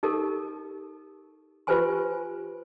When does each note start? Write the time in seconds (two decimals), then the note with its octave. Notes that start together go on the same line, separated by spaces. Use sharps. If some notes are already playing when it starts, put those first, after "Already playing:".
0.03 D#4 G4 A4 A#4
1.67 F4 G4 B4 C5 G#5 C6